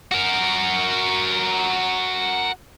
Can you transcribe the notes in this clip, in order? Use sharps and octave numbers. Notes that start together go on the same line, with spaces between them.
F#4 A#4